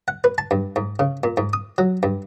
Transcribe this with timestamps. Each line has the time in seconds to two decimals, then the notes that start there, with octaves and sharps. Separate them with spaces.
0.08 F#5
0.24 B4
0.38 A5
0.51 G2
0.76 G#2
0.99 C#3
1.24 A#2
1.37 G#2
1.53 D#6
1.78 F#3
2.03 G2